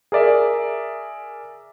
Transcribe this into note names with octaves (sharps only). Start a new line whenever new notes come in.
G#4 A#4 D5 E5